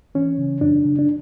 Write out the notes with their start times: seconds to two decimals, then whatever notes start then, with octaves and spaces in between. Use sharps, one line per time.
0.15 E3 C#4
0.38 C#3
0.61 F#2 D4
0.84 C#3
0.99 D4